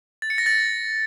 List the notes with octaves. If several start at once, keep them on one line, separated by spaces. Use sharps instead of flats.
A6
C#7
A#6
A6